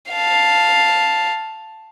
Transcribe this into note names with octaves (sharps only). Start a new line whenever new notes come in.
F5 A5